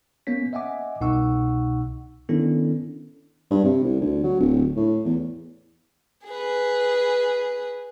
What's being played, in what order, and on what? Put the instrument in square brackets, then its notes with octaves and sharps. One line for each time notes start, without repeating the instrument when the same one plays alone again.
[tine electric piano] A#3 B3 C#4 C#5 B6
D#5 E5 F#5 G#5 D6
C2 B2 D#4 F#5 C#6 E6
D#3 B3 C#4 D4 E4 A4
[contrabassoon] G2
C3
C2
D2
F#3
D1
A2
E2
[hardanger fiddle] G#4 B4